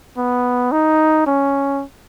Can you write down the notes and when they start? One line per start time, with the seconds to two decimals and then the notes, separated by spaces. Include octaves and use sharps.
0.17 B3
0.72 D#4
1.26 C#4